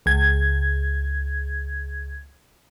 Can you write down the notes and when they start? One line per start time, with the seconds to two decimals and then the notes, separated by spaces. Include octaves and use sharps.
0.06 C#2 G#6